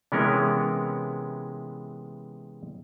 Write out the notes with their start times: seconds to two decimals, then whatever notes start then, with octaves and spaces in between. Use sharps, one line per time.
0.12 C3 E3 G#3 B3 C#4 A#4